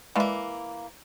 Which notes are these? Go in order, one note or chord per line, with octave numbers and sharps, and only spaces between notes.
E3 G#3 A#3 D5 F5